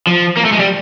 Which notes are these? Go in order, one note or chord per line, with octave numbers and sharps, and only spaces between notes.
F3
A#3
A3
G#3
G3